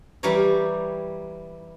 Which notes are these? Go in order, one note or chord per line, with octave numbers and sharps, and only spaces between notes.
E3 G3 G4 A#4 C#5